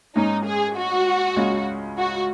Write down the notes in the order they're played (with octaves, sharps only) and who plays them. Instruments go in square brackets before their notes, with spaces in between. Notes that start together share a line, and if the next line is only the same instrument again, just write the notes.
[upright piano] G#2 G#3 C#4 [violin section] D#4
[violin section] G#4
F#4
[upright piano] C#2 C#3 G#3 C#4
[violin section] F#4